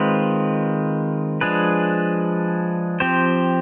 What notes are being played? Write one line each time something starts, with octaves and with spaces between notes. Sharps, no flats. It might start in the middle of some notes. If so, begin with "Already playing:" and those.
Already playing: D#3 G#3 C4 F4 B4
F3 G#3 D4 G#4 B4
F3 C4 G4 C5